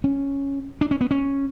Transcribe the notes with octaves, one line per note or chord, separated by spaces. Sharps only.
C#4
D4
C#4
B3
C#4